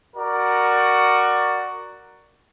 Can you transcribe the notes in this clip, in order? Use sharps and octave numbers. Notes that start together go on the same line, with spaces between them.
F#4 A#4 D5